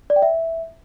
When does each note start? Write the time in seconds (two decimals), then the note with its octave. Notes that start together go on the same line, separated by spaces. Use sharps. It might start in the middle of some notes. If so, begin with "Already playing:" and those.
0.10 D5
0.16 G5
0.22 E5